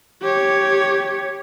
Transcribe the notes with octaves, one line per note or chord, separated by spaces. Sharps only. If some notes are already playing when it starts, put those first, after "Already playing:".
G4 C#5